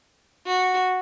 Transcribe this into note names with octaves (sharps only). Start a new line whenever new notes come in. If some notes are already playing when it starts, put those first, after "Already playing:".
F#4